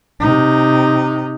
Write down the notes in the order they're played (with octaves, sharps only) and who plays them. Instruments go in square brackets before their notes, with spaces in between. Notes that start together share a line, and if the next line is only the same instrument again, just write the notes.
[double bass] C3 D#4